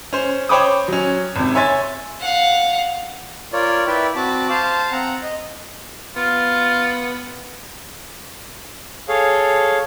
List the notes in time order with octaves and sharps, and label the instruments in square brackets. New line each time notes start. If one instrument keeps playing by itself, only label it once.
[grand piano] C#4 C5
C5 C#5 G5 B5 D6 D#6
F#3 C#4
G#1 C3
C#5 E5 G#5 C6 A6
[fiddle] F5 F#5
[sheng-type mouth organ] F4 A#4 C#5 D5
E4 B4 D5 E5 G5
C4 F#4 A5 B5 D6
C5 F5 A5
C4 F#5 A#5
D#5
[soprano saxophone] B3 [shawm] F4
[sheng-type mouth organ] G#4 A4 C#5 F5